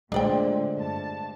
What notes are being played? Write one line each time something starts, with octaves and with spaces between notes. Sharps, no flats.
A#2 D3 G#3 A3 D4 C5 D5 G5
G2 A5